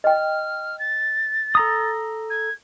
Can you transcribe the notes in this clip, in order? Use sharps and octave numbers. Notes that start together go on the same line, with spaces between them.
D#5 G5 F6
A6
A4 A#5 D#6
G#6